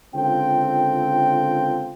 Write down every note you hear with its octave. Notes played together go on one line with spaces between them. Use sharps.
C#2 D3 C4 F4 A4 G5